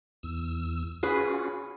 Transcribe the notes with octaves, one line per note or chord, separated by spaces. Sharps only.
E2 E6
C#4 F4 F#4 G#4 B4 B5